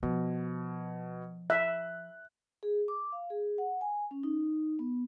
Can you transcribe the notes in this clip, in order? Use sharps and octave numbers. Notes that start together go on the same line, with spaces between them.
B2 F3
E5 F#6
G#4
D6
F5
G#4
F#5
G#5
C#4
D#4
B3